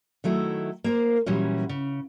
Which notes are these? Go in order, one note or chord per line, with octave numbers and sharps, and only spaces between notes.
D#3 F#3 A3 E4
A#3 A#4 C5
A#2 E3 F#3 G3 C#4
C#3